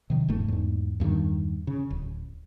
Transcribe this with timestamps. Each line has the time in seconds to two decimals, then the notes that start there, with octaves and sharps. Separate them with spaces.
0.10 C3 D#3 F#3
0.28 F1 E2 G#2 A3
0.48 E2 G#2
1.00 E2 G2 D3 D#3
1.67 C#3
1.90 D1